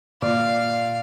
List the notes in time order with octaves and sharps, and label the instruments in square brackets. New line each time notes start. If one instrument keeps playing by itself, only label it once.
[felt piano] A#2 [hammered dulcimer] D5 [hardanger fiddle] F5